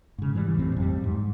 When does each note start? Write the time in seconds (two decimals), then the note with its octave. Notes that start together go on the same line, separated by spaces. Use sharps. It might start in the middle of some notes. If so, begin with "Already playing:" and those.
0.18 G#2 C#3
0.35 E3 G3
0.55 A1 F2 A2 C4
0.76 F2 F#3 G3
1.04 G#2